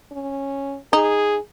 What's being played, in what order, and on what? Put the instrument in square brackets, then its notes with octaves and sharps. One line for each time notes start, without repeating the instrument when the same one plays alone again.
[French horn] C#4
[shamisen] D#4 [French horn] G#4